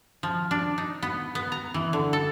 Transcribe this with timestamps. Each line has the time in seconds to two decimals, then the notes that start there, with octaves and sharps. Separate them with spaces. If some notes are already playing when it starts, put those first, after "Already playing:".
0.23 F3
0.51 D4
0.78 D#4
1.02 B3
1.35 B3
1.52 A#5
1.74 E3
1.93 D3
2.13 A4